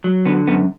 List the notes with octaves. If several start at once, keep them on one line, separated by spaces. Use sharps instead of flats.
F#3
D3 B3
F#2 B3